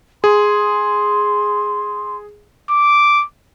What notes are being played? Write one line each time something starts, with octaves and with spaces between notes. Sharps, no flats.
G#4 C6
D6